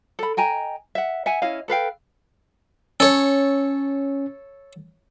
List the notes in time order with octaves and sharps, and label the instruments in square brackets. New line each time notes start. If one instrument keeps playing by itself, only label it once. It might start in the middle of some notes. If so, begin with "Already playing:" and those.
[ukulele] A4 B5
D#5 G5 G#5 A#5
E5 F#5
E5 F#5 G#5
C#4 E4 D#5 F5
A4 B4 F5 G5
[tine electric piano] C#4 [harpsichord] A4 C#5